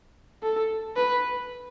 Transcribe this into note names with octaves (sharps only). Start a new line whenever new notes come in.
A4
B4